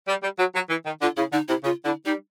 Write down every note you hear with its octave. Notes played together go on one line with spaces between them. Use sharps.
G3
G3
F#3
F#3
E3
D#3
D3 F4
C#3 E4
D3 D#4
C3 E4
C#3 F4
D3 E4
G3 D#4